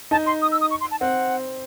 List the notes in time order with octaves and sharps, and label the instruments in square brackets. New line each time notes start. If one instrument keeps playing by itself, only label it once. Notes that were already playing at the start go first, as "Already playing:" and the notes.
[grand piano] D#4 [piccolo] A5
[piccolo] C6
D#6
E6
D#6
C#6
C6
A5
[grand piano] C4 [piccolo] F#5